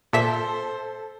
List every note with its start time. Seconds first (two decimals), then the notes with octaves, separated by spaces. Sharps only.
0.13 A#2 A4 C5 E5 B6